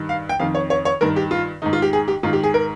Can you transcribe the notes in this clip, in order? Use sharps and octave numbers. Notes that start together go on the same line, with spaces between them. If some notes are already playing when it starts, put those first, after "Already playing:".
Already playing: G2 D#3
F5
G5
F2 D#3 F5
C#5
C#5
C#5
G2 D#3 A#4
G4
F4
G#2 D#3 D#4
F4
G4
G#4
G4
G#2 D#3 F4
G4
G#4
A#4